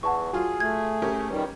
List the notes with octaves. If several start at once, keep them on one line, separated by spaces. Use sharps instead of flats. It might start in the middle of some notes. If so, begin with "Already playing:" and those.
E2 F#5 A5 C#6
F#3 F4 G#4
A3 G#6
C#4 G4 A#4
C#2 D#3 G3